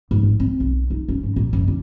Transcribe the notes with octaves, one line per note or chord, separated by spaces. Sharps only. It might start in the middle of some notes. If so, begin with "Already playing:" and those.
G#2
A1
C4
B1
D#4
C#4
G#2
A#2
F#1
D3